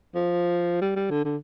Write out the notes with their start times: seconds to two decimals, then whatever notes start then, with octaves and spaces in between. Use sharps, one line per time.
0.14 F3
0.81 G3
0.96 G3
1.10 D3
1.25 D3